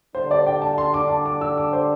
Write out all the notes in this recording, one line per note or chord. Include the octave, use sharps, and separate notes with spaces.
D3 G3 D4 C5
D5
G5
A5
C6
D6
A5
D6
E6
D6
C5